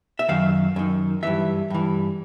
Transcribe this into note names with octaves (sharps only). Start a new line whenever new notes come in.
E5
F#2 D#3 F5
F#2 D#3
G2 E3 E5
G2 E3